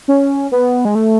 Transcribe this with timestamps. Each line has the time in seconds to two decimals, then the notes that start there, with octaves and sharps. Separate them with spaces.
0.08 C#4
0.52 B3
0.85 G#3
0.95 A3